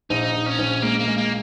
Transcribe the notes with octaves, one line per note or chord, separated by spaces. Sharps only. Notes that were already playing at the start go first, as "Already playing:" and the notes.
A#1 D#4
A#1
C#4
A#1
G#3 A#3
A#3
G#3
A#3